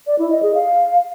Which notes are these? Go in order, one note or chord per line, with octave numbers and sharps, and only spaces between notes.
D5
E4
D#5
G#4
F5